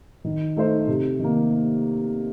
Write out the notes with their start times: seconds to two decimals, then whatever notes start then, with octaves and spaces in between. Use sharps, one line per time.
0.24 D#3
0.57 A3 D#4 A4 C5
0.88 C3
1.19 D#3 A#3